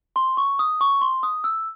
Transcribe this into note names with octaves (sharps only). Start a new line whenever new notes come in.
C6
C#6
D#6
C#6
C6
D#6
E6